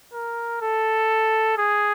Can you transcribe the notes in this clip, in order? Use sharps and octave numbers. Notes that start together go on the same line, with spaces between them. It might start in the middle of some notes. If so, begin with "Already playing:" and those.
A#4
A4
G#4